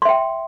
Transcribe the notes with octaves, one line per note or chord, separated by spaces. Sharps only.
E5 G5 C6